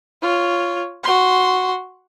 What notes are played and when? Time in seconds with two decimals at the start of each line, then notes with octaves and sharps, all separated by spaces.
0.22 F4 C#5
1.03 F#4 C6